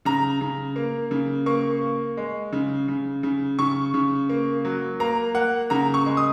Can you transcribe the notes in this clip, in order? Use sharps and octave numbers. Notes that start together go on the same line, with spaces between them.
C#3 A#5
C#3
A#3
C#3
A#3 C#6
A#3
G#3
C#3
C#3
C#3
C#3 C#6
C#3
A#3
F#3
A#3 A#5
A#3 F#5
C#3 A#5
C#6
G#3
D#6